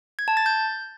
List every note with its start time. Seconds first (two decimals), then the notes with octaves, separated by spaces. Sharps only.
0.19 G#6
0.28 A5
0.37 A6
0.46 G6